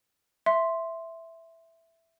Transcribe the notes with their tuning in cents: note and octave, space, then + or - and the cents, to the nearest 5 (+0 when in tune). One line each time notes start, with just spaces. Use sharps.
E5 +0 C6 +0